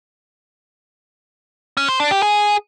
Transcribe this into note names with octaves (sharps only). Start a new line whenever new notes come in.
C#4
C5
D4
G4
G#4